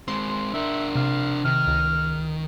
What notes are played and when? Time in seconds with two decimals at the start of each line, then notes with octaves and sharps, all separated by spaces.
0.08 G#3 C4 C6
0.53 D4 A#4 E5
0.95 C3 F5
1.45 C3 D#3 F6
1.67 C#2